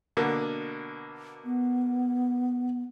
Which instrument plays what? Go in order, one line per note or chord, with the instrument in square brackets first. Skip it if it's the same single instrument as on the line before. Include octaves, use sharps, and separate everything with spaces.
[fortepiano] B2 D3 A#3
[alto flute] B3